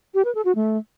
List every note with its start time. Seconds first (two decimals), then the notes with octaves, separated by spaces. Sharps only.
0.14 G4
0.25 B4
0.35 A4
0.45 F#4
0.55 A3